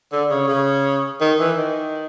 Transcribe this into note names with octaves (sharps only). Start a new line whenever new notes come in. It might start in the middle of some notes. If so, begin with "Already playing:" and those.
D3
C#3
C#3
D#3
E3
D#3